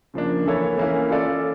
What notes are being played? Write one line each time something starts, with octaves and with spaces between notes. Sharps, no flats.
C#3 F3 A#3 D4
E3 A#3 E4 A4 C#5
E3 A#3 C#4 E4
C#4 F4 A4 D5